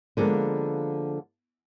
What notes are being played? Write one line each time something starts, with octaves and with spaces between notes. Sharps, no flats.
D3 F3 G#3 A#3 B3